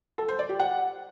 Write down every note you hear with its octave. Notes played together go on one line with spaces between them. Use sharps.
A4
C5
D5
G4
F#5